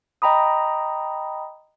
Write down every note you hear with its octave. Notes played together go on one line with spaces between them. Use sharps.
D#5 G5 A#5 B5 D#6